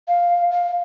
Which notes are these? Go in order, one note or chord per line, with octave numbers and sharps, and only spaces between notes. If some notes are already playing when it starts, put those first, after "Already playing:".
F5
F5